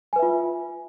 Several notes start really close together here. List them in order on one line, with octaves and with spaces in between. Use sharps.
G#5 B4 E5 F4